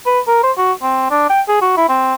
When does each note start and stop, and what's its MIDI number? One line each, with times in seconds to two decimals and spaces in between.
0.06 0.19 71
0.28 0.38 70
0.43 0.52 72
0.58 0.73 66
0.82 1.06 60
1.11 1.26 62
1.30 1.41 79
1.48 1.61 68
1.61 1.76 66
1.77 1.88 64
1.89 2.14 60